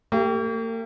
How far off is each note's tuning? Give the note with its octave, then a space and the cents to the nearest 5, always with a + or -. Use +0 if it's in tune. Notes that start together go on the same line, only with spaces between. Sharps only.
A#3 -45 G4 +0